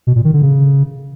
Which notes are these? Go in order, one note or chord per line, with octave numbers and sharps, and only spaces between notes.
B2
A#2
D#3
D3
C#3